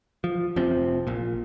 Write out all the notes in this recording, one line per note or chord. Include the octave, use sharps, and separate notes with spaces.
F3
F1 C3 F3 C4
A#1 A#2